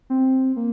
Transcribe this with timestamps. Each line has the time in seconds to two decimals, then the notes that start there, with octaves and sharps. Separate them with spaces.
0.10 C4
0.56 A#3